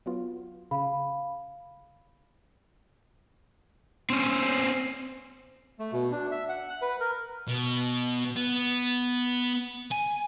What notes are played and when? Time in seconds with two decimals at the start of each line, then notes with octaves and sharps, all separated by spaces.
0.06 F#3 B3 F4
0.71 C#3 F5 B5
4.10 C4 C#4
5.79 A3
5.93 B2
6.12 D4
6.31 E5
6.49 F#5
6.70 F#6
6.82 B4
7.00 A#4
7.48 B2
8.36 B3
9.92 G#5